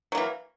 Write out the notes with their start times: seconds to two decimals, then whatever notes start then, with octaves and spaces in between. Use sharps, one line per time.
0.12 F#3
0.15 A#3
0.17 E3